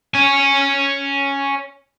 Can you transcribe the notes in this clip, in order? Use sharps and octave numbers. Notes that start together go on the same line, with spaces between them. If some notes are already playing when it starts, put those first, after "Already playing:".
C#5 G#5